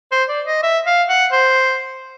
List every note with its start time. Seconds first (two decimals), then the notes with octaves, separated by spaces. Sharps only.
0.12 C5
0.29 D5
0.46 D#5
0.63 E5
0.86 F5
1.09 F#5
1.32 C5